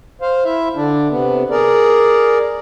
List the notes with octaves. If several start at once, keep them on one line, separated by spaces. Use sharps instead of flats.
C5 F5
E4 E5
D3 D4
C3 B3
G#4 A#4 D5